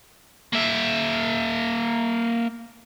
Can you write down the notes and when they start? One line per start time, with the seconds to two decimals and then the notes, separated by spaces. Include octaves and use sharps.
0.53 A#3 E5